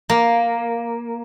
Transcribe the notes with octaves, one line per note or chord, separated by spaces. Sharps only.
A#3